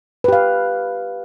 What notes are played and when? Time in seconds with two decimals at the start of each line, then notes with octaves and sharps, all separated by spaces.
0.24 B4
0.28 G4
0.33 F5